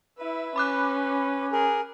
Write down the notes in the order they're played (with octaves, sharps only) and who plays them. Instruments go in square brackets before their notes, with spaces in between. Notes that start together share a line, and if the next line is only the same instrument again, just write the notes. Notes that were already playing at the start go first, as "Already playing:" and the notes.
[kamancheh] E4 E5 [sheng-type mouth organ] B4
[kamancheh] C#4 [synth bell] B5 D6 F#6
[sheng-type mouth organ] G#4 A#4